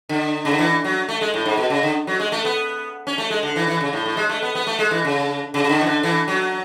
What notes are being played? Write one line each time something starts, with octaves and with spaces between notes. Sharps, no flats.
D3
C#3
D3
E3
F#3
A3
G#3
A2
G#2
B2
C#3
D3
F#3
G#3
A3
B3
C#4
A3
G#3
D3
E3
E3
C#3
A2
A2
G#3
A3
B3
B3
A3
G#3
E3
C#3
C#3
C#3
D3
E3
D3
E3
F#3